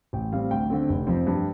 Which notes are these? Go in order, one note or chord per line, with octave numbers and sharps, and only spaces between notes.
A1 G5
A2 G3 C4 F5
D2 G5
D3 A3 C4
F1
F2 F3 C4
G2